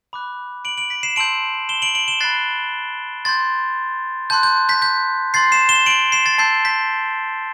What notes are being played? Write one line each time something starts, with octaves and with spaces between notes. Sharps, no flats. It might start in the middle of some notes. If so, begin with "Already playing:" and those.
B5 D6 F#6
D7 F#7
D7 F#7
B6 D7
C7 E7
A5 C6 E6 G6 D7 F#7
E7 G7
D7 F#7
D7 F#7
E7 G7
B5 F#6 A6 C7
C6 G6 A6
A5 C6 F#6 G6
G6
G6 B6
G6 B6
C6 G6 A6 C7
C7 E7
E7 G7
D7 F#7
C7 E7
A6 C7
A5 E6 G6 A6 C7
G6 B6